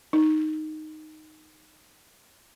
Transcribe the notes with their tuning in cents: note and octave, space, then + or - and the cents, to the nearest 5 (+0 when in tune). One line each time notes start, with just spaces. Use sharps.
D#4 -5